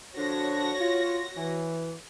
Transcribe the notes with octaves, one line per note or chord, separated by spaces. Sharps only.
D3 F3 D4 F#4 C#5 A#6
F4
E3